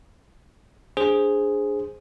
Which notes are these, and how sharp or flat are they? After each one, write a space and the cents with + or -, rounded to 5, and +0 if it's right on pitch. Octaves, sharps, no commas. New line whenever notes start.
D4 +0 G#4 +0 C5 +0